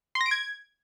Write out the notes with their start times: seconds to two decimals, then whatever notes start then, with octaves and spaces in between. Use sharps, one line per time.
0.15 C6
0.21 A#6
0.26 D7
0.31 G#6